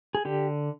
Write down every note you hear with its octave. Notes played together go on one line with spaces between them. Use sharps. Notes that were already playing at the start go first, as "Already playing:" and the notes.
G#4
D3 G4